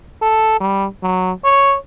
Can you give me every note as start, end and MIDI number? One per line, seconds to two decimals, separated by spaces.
0.22 0.56 69
0.61 0.87 55
1.03 1.32 54
1.45 1.76 73